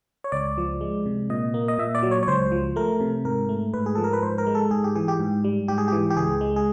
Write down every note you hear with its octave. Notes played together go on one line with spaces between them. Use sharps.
C#5
C#2 D5
F3
G#3
C3
A#2 D#5
A#3
D#5
A#2 E5
D5
F#3
C#5
C#5
C#2 C5
F3
A3 A#4
C3
G#2 A#4
A3
G#2 B4
G#4
F3 A4
A#4
B4
G#2 C5
A#4
G#3
A4
G#2 G#4
G4
E3 G#4
G4
G#2
G3
G#2 G4
G#4
E3 G4
G4
C#2 G#4
G#3
G#4